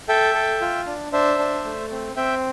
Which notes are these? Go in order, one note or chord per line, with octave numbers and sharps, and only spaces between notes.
A4 E5 G5
A4
F4
D4
D4 C5 E5
D4
A3
C4
C4 E5 G5